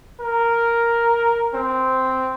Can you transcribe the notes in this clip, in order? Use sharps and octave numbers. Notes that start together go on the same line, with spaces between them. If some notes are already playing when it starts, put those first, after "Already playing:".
A#4
C4